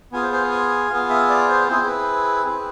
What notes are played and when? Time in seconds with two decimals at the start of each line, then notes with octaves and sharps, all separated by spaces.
0.12 B3 F4 G#4 G#5
0.23 C5
0.33 C5
0.51 G#5
0.90 B3 F4 G#4 F5
1.09 E5
1.29 D5
1.48 C5
1.68 C4 E4 G#4 C5
1.87 B4
2.46 C4 E4 G#4